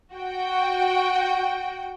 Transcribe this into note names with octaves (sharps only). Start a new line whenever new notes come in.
F#4 G5